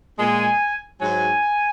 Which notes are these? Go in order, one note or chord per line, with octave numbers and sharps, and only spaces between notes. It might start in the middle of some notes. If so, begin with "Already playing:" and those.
A#2 G#3 G#5
G#2 F#3 G#5